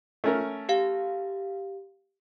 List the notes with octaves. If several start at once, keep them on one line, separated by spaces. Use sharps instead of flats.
A3 C#4 A#4
G4 F5